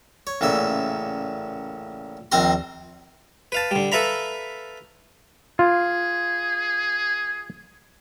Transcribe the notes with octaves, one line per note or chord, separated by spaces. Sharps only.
C#5
A1 A#2 C#3 E5
A#1 D#2 C4 F5 A#5 C6
B4 F5 A5
D3 G3
A4 B4 E5 F5 A#5 B5
F4 G#4